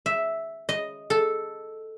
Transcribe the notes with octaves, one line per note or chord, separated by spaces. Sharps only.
E5
D#5
A4